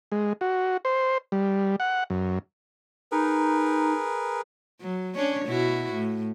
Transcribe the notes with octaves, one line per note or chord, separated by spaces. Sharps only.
G#3
F#4
C5
G3
F#5
F#2
D#4 G#4 A#4 B4
F#3
C#4 D4 C#5
B2 E4 F#4
A2